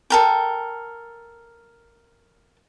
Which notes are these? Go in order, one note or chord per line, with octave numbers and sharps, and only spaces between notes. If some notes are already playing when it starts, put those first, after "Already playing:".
A4 A#4 G5